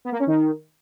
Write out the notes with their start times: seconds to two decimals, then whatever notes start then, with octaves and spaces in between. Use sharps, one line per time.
0.05 B3
0.12 A#3
0.20 C#4
0.27 D#3